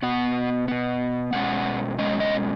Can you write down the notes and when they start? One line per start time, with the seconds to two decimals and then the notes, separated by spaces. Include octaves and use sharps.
0.02 B2 B3 F#5
0.68 B2 B3
1.33 B2 G#3 C#4 F#5
1.98 B2 G#3 C#4 D#5
2.20 D#5